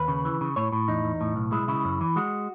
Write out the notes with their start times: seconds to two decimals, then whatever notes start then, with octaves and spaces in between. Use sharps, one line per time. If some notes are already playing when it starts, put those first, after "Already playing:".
Already playing: D#2 B4
0.08 C#3
0.25 E3
0.41 C#3
0.56 A2 C#5
0.72 A2
0.88 E2 D#4
1.04 E2
1.21 A2
1.36 B1
1.52 G#3 E4
1.68 C#3 E4
1.85 F#2
2.01 E3
2.16 G#3 F#4